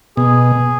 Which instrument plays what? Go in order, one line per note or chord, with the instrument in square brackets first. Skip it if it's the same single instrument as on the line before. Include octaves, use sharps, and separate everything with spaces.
[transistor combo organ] B2 [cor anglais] G#4